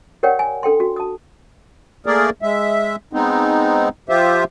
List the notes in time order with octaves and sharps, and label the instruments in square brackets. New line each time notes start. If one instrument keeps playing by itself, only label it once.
[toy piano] G4 A#4 C#5 D5 F#5 G5
G#5
D4 A4 G5 C6
F#4
A5 D#6
[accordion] A3 A#3 G#4 A#4 D5
G#3 E5
G#3 B3 C4 D#4
F3 F4 G4 C5 E5